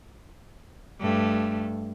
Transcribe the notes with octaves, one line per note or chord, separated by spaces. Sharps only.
G2 A3